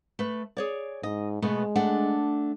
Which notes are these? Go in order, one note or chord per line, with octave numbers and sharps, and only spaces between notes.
A3 B4
G#4 C#5 D5
G#2 D#5
B2 G#3 A3 B3
A3 D4 F#5